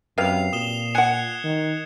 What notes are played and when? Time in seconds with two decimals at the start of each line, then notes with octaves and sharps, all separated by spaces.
0.18 F#2 C3 B4 F5 C7 F7
0.53 A#2 D#6 E7 G7
0.95 F#5 G#5 F#6 G#6 C#7
1.44 D#3